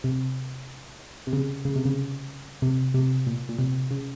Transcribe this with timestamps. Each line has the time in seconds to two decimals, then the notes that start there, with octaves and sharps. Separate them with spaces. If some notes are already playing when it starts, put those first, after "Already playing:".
0.04 C3
1.27 C3
1.33 C#3
1.65 C#3
1.76 C3
1.85 C#3
2.62 C3
2.94 C3
3.27 A#2
3.49 A#2
3.59 C3
3.91 C#3